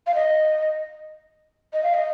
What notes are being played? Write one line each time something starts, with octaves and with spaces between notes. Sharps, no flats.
F5
D#5
D#5
F5
D#5